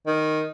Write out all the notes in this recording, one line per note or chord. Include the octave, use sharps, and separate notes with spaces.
D#3